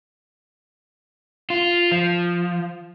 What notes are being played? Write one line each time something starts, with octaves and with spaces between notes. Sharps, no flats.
F4
F3